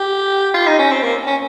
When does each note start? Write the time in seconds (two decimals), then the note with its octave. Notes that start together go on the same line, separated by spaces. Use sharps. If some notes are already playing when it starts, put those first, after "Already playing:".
Already playing: G4
0.55 F4
0.67 D#4
0.79 C#4
0.91 C4
1.03 A#3
1.27 C#4